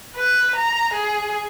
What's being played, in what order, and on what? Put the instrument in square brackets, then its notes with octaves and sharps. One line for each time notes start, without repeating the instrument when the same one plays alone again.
[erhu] B4
A#5
G#4